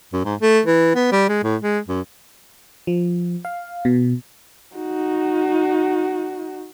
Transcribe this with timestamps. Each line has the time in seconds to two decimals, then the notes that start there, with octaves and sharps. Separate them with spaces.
0.13 F#2
0.25 G#2
0.41 A3
0.66 E3
0.95 B3
1.12 G3
1.29 G#3
1.44 A2
1.62 G#3
1.88 F#2
2.87 F3
3.45 F5
3.85 B2
4.75 D#4 F#4